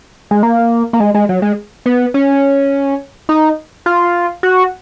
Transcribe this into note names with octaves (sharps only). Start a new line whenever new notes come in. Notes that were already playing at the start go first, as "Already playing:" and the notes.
G#3
A#3
A#3
G#3
G#3
F#3
G#3
B3
C#4
D#4
F4
F#4